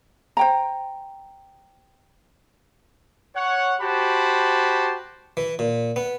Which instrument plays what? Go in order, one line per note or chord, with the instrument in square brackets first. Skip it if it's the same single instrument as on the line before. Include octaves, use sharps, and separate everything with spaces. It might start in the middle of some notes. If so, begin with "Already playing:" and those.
[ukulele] C5 G5 A#5
[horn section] C#5 F#5
F#4 G4 C5 A5 B5
[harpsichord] E3
A#2
B3